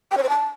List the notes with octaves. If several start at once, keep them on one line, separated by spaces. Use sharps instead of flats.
G5
C#5
C5
A5